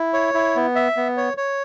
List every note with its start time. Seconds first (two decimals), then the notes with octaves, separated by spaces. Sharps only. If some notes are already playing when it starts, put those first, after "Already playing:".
Already playing: E4
0.13 C#5
0.34 E4
0.55 B3
0.75 E5
0.97 B3
1.17 C#5
1.37 C#5